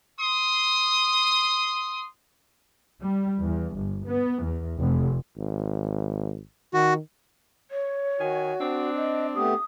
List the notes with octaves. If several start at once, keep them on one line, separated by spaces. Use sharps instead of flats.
C6 D#6
G3
E2
G1
B3
E2
F1
G#1
D#3 F#4
C#5
D#3 F#4 G#5
C4 D4
D#5
A3 B3 G4 D#6